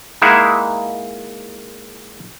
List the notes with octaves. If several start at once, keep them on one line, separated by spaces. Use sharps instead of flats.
G#3 A#3 D#4 E4 E5 F#5